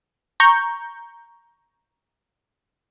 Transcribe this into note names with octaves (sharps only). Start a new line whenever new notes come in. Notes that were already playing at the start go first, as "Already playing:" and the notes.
A#5 C#6 G6